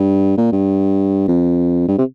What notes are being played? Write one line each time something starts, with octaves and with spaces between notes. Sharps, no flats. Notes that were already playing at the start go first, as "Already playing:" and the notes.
Already playing: G2
A#2
G2
F2
G2
C3